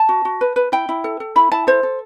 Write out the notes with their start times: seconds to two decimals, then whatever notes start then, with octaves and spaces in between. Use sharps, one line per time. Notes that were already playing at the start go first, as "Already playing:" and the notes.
Already playing: A5
0.09 F#4
0.25 F#4
0.41 B4
0.56 B4
0.72 E4 G5
0.89 E4
1.04 A4
1.20 A4
1.36 E4 B5
1.52 E4 A5
1.67 A4 C5
1.83 A4